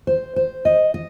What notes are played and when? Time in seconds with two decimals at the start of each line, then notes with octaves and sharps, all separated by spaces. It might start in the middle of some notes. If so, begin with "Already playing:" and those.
0.07 C5
0.36 C5
0.65 D#5
0.94 D#5